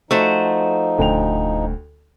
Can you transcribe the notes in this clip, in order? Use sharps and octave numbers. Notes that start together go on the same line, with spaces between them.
F3 A3 D#4 F#4 C5
D#1 D2 G5 F7